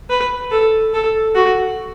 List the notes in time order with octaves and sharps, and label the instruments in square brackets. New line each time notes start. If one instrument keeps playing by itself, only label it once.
[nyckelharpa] B4
A4
A4
F#4